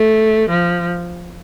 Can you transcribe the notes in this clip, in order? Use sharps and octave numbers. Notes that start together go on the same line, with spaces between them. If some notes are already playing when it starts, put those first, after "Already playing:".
Already playing: A3
F3